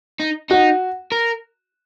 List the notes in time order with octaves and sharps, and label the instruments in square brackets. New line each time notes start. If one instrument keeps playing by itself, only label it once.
[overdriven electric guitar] D#4
[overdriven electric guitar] D#4 [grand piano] F#4
[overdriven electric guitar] A#4